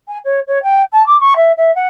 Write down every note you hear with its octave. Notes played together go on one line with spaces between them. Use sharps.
G#5
C#5
C#5
G5
A5
D6
C#6
E5
E5
F#5